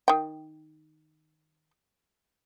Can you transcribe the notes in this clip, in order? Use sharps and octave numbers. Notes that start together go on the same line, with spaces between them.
D#3 G5